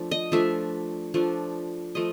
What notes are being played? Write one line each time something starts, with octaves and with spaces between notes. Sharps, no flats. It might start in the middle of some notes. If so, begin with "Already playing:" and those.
Already playing: F3 A3 D4
D#5
F3 A3 D4 E5
F3 A3 D4
F3 A3 D#5